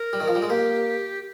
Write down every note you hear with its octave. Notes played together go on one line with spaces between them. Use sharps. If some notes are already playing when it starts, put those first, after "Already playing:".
Already playing: A#4
G3
D#3
F3
G3
G#3
A#3 G4